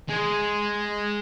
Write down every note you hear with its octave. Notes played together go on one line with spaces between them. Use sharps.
G#3